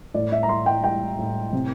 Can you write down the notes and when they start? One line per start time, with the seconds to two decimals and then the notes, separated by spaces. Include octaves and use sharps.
0.14 A2 D5
0.32 E5
0.43 A#5
0.49 A2 C6
0.66 G5
0.83 G3 G5
1.18 A2
1.53 C3